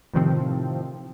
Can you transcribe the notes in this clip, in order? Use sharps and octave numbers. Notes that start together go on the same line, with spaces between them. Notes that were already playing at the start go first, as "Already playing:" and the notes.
A2 C3 D#3 F3 C4